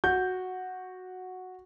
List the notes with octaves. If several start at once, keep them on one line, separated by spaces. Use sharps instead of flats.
F#4 G6